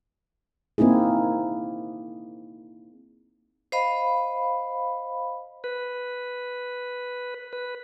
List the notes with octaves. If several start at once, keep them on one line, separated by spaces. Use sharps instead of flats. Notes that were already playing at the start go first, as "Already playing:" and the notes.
A#3 C4 D#4 E4 G#4
C5 D#5 F5 B5
B4
B4